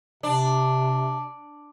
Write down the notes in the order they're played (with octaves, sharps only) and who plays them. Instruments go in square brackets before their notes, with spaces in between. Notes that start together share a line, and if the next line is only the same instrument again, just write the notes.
[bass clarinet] C3 [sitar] D4